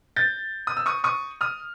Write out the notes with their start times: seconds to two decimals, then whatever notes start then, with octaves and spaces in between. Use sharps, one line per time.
0.16 G6 A6
0.67 D#6
0.77 E6
0.86 C#6 D#6
1.04 C#6 D#6
1.41 D#6 F6